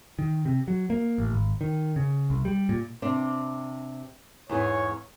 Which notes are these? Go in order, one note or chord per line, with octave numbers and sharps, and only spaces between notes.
D#3
C3
F#3
A#3
A1
G#1
D#3
C#3
C2
G3
A#2
C3 D4
E2 G#2 G#4 C#5